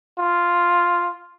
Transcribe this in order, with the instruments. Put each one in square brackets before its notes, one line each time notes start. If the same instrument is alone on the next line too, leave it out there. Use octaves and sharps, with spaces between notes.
[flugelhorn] F4